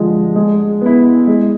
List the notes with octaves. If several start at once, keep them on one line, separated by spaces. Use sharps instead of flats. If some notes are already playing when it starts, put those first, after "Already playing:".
Already playing: D3 F3 G#3
G#3
B3 E4
G#3